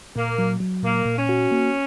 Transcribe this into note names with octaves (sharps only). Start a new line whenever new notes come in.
A#2 A#3
F#3
F#3
A#2 A#3
A#2
C#4
F#4
A#3